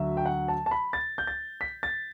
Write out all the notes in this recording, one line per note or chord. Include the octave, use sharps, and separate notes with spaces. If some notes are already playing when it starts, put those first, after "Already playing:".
Already playing: D2 D3 F#3 E5
G5
F#5
A5
A5
B5
A6
G6
A6
B6
A6